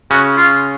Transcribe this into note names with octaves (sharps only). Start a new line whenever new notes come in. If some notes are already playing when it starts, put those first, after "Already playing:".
C#3 C#4 F#4
F4